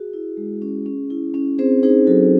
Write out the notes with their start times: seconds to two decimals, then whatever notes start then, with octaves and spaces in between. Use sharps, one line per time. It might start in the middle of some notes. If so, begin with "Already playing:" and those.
Already playing: F#4 G#4
0.14 E4
0.37 G#3
0.62 C#4
0.86 C#4
1.10 E4
1.34 C#4
1.58 C4 G#4 C5
1.83 D#4 G#4 C5
2.07 F#3 F#4 A4